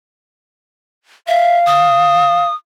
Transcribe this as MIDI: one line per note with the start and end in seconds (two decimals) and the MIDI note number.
1.28 1.59 76
1.28 2.45 77
1.66 2.54 87